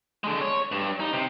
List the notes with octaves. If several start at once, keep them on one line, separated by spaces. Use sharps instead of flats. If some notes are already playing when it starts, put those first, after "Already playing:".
D3 G#3
C#5
G2
D#4
C3